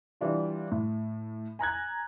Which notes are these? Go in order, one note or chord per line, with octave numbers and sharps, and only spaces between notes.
E3 G3 D4 F4
A2
G#5 A#5 F#6 G#6